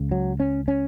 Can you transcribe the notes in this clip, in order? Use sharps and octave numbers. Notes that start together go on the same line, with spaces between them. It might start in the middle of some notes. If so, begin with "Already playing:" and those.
Already playing: C#2 C#3
F#3
C#4
C#4